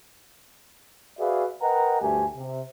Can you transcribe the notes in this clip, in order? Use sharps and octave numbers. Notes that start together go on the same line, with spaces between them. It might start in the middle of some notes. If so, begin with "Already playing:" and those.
F#4 G#4 B4 D5 E5 F5
A#4 B4 D#5 F#5 G5 A#5
D2 G2 A3 G4 G#5
C3